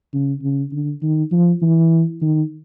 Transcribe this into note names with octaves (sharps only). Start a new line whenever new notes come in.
C#3
C#3
D3
D#3
F3
E3
D#3